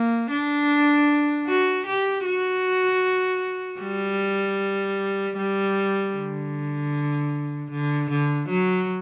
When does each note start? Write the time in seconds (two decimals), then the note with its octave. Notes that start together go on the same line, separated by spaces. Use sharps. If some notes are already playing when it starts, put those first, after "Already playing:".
Already playing: A#3
0.30 D4
1.47 F#4
1.86 G4
2.25 F#4
3.80 G3
5.37 G3
6.14 D3
7.71 D3
8.10 D3
8.49 F#3